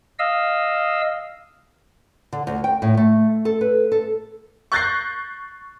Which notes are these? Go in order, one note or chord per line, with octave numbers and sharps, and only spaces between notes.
D#5 F5 E6
D3
D2
G5
A2
A3
A4
B4
A4
C#6 F#6 G6 A6 A#6 C7